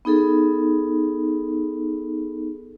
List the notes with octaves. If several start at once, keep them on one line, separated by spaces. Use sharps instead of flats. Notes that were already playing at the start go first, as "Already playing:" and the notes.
B3 D#4 G#4 A4